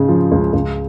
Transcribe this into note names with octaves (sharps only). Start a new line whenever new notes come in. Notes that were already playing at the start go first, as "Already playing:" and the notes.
Already playing: G#2 C#3 G#3
F3
C#2
C#2